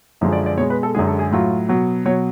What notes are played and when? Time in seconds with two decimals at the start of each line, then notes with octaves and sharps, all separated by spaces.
0.21 F#2 D3 F3 G#3
0.33 D5
0.46 D5
0.57 B2 C#5
0.61 G#3
0.70 B4
0.83 A4
0.95 F#2 D3 G#3 G#4
1.07 A4
1.19 G#4
1.31 A2 F#3 F4
1.69 B2 F#3
2.06 B2 F#3 C#5